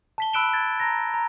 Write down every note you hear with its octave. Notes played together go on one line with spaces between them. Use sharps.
A5 B6 G7
B5 E6 F#6 D7 E7 G7
G#6 A6
A#5 A#6
A#5